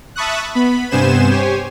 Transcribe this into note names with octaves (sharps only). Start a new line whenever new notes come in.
E5 A5 B5 C#6 D#6 F#6
B3 B5
G2 C3 B3 C5 G#5 E7
G4 C5 C#5 G#5